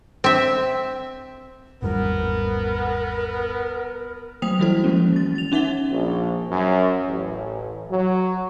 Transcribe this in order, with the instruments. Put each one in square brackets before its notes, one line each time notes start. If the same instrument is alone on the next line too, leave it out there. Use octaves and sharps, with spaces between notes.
[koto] C4 E5
[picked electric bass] G#1 E2 G3 [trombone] B3 [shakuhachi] A#4
[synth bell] F#3 A3 C5 G5 D#6 F7
E3 G3 E4 F#4 A4 C5
F3 G#3 A#3 C#4
D#3 A6
A6 F7
C#4 D#4 E5 F#5 G7
[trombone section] A#1
F#2
A1
F#3